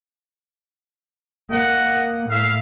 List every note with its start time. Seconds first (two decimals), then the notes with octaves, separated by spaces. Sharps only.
1.50 A#3 D#5 F#5
2.30 A2 E5 F5